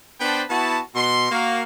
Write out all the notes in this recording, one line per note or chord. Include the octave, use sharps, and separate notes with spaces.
B3 D4 B4 C5 G5 A5
B3 E4 F#4 A5
B2 C6
A#3 F#4 F5